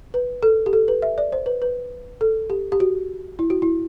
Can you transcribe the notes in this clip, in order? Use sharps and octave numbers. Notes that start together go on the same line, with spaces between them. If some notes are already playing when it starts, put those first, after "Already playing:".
B4
A4
G4
A4
B4
E5
D5
C5
B4
B4
A4
G4
G4
F#4
E4
F#4
E4